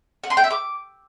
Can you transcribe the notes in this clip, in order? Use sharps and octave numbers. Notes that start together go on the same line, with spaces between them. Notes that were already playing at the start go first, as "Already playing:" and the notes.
F#5
C6
G5
E5
D6